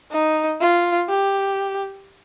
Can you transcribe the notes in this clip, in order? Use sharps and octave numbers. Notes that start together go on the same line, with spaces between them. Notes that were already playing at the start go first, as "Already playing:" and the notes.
D#4
F4
G4